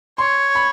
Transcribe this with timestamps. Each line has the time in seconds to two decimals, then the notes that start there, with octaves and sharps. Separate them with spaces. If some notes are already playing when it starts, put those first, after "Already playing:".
0.18 C#5 C6
0.55 B5